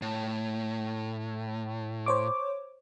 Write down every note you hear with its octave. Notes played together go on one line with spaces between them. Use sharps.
A2
C5 C#5 D6